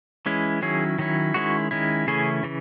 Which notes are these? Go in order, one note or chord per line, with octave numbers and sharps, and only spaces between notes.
E3 G#3 C#4 E4
D#3 F#3 C#4 E4 G#4
D#3 F#3 C#4 E4
D#3 G#3 C#4 E4 F#4
D#3 G#3 C#4 E4
C#3 E3 A3 C#4 E4 G#4
C#3 E3